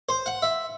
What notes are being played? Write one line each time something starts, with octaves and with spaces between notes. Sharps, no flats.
C5
F#5
E5